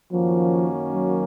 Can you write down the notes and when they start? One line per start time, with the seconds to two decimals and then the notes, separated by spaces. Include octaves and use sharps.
0.12 F#2 D#3 F3 A#3 C#4 F#4
0.94 F#3